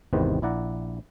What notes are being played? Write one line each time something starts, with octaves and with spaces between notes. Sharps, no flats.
G#1 E2 C3 D#3 B4 C5
A#1 E4 D5 F#5 A#5